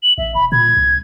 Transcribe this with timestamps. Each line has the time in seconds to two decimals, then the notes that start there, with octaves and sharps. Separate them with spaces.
0.03 F#7
0.18 A1 E5
0.35 E1 B5
0.52 A#2 G#6
0.76 C2